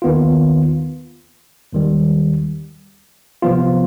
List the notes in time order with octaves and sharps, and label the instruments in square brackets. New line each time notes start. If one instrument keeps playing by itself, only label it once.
[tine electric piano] D#2 D#3 B3 F4
D#2 D#3 G3
C2 C3 F3 B3 F4